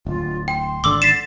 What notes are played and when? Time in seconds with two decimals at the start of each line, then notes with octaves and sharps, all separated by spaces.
0.07 D1 F4
0.48 G5 C6
0.84 G#1 D3 D6 E6 F#7
1.02 A6 B6 C7 E7